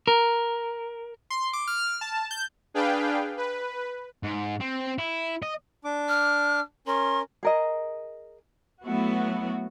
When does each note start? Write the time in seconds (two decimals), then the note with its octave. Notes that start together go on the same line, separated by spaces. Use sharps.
0.07 A#4
1.30 C6
1.53 D6
1.67 F6
2.01 A5
2.31 G6
2.74 D4 G#4 B4 F5 G5
3.37 B4
4.23 G#2
4.61 C4
4.99 E4
5.42 D#5
5.84 D4 D6
6.09 F6
6.87 C#4 A#4 C6
7.43 G#4 A#4 D#5
8.85 F#3 A3 B3 E4 F#4